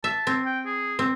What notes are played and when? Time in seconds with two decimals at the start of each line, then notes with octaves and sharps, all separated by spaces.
0.04 E5 A5
0.27 C4
0.46 G5
0.66 G#4
0.99 C4